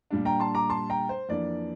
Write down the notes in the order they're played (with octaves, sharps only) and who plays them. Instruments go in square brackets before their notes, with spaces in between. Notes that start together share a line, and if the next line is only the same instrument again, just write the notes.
[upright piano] A#2 G3 D4
G5 A#5
A5 C6
A#5 D6
A5 C6
G5 A#5
C5
F2 E3 A#3 D4 D5